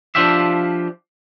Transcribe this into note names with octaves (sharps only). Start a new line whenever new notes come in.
F3 D4 F4 G4 E5